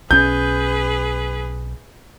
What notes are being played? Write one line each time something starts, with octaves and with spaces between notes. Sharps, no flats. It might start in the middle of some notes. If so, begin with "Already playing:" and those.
B1 C#4 G#4 B4 G6